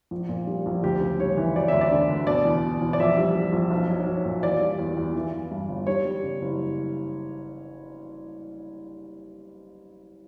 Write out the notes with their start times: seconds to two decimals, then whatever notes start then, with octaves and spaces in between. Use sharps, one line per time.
0.11 A#1
0.29 A#2
0.47 G3
0.66 A#1
0.83 D2 G4
1.01 C#3
1.19 G3 C#5
1.37 E3
1.56 F#3 D5
1.68 D2 E5
1.81 D5
1.92 D3
2.09 D2
2.27 B2 D5
2.45 E2
2.63 B2
2.81 E2
2.93 D5
3.00 A#1 E5
3.17 G3
3.35 G3
3.53 A#1
3.71 B1
3.89 F#3
4.07 F#3
4.25 A#2
4.43 E2 D5
4.61 G3
4.79 E2
4.97 E2
5.15 E3
5.34 E3
5.51 G2
5.69 G1
5.86 G3 C#5
6.05 G3
6.23 C#3
6.42 F#1